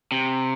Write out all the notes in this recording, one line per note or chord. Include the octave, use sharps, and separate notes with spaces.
C3